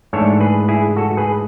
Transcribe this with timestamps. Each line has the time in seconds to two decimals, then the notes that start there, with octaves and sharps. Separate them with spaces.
0.13 G#2 E3 A3 D4 A4 C#5
0.40 G#4 B4
0.69 E4 G#4
0.96 F#4 A4
1.17 G#4 B4